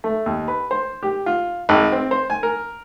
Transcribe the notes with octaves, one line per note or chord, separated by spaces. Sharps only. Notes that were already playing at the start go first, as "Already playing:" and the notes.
A3
D#2
B4
C5
G4
F4
G#1
C4
C5
G#5
A#4